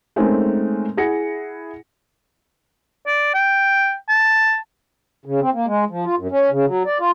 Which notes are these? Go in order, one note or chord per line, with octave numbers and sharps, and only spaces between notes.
G#3 A3 C4 C#4 D#4 A#4
E4 G#4 F#5 A#6 C#7
D5
G5
A5
C#3
C4
A#3
G#3
F3
F4
F#2
C#4
C#3
F#3
D5
F4